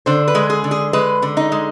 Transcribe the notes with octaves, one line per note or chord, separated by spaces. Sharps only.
D3 C5
B4
G#3
G#4
D3
G#4
G#3 B4
D3
D#4
G#3